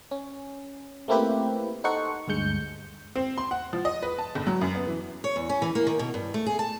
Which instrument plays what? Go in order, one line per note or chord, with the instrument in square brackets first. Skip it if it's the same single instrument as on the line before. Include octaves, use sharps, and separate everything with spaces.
[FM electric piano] C#4
A3 A#3 C4 E4 G4 B4
D#4 A4 C5 F#5 C#6
D2 G2 G#3 G6 C#7
[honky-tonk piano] C4
C6
F#5
F3
D#5
B4
A5
G1
F#3
F#2
B3
E3
[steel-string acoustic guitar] C#5
E2
C#4
E3
A#3
D#3
B2
G2
A3
G#4
A5